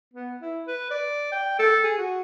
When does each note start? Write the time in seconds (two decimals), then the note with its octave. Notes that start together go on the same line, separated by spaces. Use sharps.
0.13 B3
0.41 E4
0.67 B4
0.91 D5
1.32 G5
1.59 A4
1.83 G#4
1.98 F#4